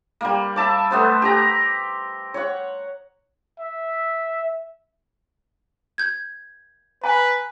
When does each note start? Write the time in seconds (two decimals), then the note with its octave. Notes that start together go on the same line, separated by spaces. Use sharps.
0.21 G3 A#3
0.56 E5 A5 D6
0.91 A3 B3 C5
1.22 G4 A#5
2.34 C#5 F#5
3.59 E5
5.98 G6 G#6
7.04 B4 G#5 A#5